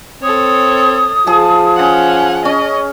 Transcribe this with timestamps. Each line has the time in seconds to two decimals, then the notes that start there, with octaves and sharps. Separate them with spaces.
0.23 C4 A4 C#5 D#6
1.27 F3 G#4 A5
1.76 C#4 F#5
2.45 C#4 D#5